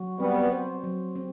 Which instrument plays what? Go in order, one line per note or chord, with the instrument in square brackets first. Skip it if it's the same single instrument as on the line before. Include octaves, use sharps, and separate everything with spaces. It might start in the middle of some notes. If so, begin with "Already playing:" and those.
Already playing: [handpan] F#3 F#4
[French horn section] G3 B3 [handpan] C4
[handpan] C5
F#3
C4